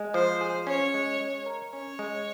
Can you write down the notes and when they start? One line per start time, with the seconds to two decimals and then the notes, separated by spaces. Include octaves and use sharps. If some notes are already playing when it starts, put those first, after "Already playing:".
Already playing: G#3
0.14 F3 C5
0.41 G#4
0.67 C#4 C#5
0.94 G#3
1.20 G#3
1.46 A#4
1.73 C#4 C#5
1.99 G#3